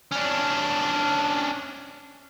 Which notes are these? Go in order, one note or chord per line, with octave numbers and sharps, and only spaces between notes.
C#4 D4